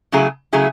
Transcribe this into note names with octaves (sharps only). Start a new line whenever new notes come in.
C#3 F#3 A3 E4 G#4
C#3 F#3 A3 E4 G#4